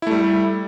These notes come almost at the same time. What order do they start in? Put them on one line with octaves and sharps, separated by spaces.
E4 A3 G3